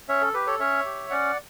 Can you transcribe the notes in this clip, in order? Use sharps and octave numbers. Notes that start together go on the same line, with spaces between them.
C#4 C#5 E5
A4
G4 B4
A4 C#5
C#4 C#5 E5
G4
C#4 D5 F#5